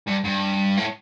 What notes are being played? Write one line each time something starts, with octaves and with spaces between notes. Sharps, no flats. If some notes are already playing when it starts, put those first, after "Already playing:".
G2
G2
A2